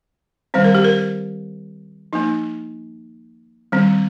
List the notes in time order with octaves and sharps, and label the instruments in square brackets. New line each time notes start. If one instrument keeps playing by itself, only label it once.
[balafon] D#3 G3 C4 C5
A#4
G4
A#4
F3 A#3 D#4
D#3 G3 C4